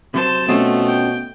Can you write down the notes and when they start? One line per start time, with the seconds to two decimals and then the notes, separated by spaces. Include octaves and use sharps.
0.14 C3 F#3 C5 A5
0.48 B2 A3 C4 C#4 F4
0.87 G5